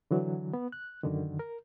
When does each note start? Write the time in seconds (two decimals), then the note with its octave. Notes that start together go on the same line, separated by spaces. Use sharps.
0.11 D3 E3 F#3
0.53 B3
0.72 F#6
1.03 F#2 D3 D#3
1.39 A#4